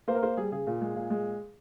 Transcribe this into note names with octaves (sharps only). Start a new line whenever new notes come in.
A#3 C5
A#4
A#3 C5
G3 G#4
C#3 G#4
A#2
G#3
A#2
G#3